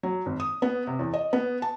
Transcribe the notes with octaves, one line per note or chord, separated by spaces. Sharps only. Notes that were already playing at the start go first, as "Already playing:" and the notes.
F#3
G#1
D#6
B3
C3
E2
D#5
B3
A5